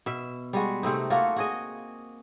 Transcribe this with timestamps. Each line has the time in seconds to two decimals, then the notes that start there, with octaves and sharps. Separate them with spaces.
0.06 B2 E5
0.53 G3 G#3 F#4
0.83 C3 A3 C4 D#4
1.10 A3 A#3 F4 F#4
1.36 F#4 G#4 D#5